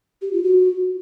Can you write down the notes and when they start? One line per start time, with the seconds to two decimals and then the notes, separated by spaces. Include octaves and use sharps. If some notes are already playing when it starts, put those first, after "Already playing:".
0.22 G4
0.33 F4
0.44 F#4